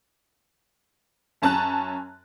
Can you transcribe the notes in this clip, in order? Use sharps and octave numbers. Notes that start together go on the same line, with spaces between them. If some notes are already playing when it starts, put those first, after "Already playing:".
F#2 C#4 A5 A#5 F#6